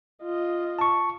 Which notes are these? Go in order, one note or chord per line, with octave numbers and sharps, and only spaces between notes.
F4 D#5
A5 C#6